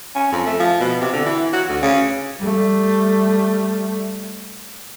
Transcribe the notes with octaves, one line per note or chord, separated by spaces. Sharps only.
C#4
F2
A3
F3
B2
C3
D3
E3
F#4
D2
C#3
G3 A3